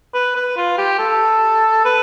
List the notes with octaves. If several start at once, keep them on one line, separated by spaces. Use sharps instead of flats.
B4
B4
F4
G4
A4
B4